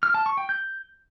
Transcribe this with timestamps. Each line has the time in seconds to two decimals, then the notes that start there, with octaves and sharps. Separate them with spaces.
0.03 F6
0.14 A5
0.26 C#6
0.37 G5
0.49 G6